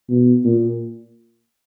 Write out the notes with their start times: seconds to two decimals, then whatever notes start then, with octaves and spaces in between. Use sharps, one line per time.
0.09 B2
0.44 A#2